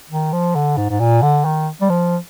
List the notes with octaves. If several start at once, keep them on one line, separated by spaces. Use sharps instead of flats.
D#3
F3
D3
G#2
G#2
A#2
D3
D#3
G3
F3